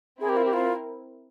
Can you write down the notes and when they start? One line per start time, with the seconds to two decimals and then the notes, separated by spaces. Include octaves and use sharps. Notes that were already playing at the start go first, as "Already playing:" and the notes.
0.20 C4 E4 G#4 A#4
0.29 G4
0.37 F4
0.46 G4
0.53 F4